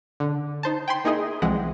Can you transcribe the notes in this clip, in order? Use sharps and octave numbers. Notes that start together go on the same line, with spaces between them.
D3
D#4 C5 A5
G5 G#5 B5 C6
A#3 D#4 E4 G#4 D#5
C2 E3 F3 G#3 C4 F#5